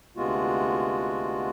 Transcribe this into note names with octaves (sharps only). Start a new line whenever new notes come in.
D2 C3 G#3 B3 F4 F#4